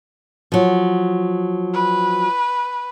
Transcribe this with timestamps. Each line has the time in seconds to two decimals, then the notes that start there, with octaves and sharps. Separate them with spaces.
0.52 F3 F#3
1.74 B4